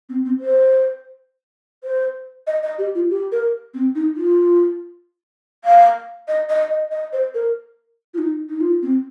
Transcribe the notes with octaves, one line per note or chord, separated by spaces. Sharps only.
C4
C4
C5
C5
D#5
D#5
G4
F4
G4
A#4
C4
D#4
F4
F5
D#5
D#5
D#5
D#5
C5
A#4
F4
D#4
D#4
F4
C4